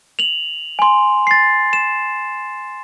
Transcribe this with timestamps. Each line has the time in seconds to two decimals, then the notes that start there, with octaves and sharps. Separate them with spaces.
0.19 F7 F#7
0.79 G#5 C6
1.27 A6 C7
1.73 E7